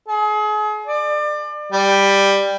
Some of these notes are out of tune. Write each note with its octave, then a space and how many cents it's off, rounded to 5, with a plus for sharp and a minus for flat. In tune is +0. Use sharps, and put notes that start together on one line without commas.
G#4 +35
D5 +30
G3 +10